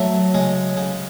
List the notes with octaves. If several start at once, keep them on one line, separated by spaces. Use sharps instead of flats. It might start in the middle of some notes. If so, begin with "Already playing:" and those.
Already playing: F#3 A3
C#3 G#3
C#3